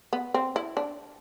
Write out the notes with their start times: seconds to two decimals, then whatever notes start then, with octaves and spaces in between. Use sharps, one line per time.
0.13 B3
0.34 C4
0.56 E4
0.77 D4